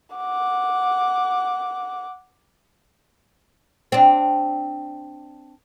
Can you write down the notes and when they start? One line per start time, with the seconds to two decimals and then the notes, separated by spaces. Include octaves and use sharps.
0.16 F#5 D6
3.92 C4 D4